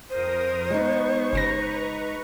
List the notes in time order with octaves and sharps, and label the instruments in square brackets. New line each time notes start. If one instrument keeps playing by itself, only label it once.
[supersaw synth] F2 A#4 D#6 [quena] C5
[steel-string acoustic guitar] G#3 D#4 [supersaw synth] B3 C#6
[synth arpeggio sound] G1 C#3 A#6 [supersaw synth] B4 A#5 C#6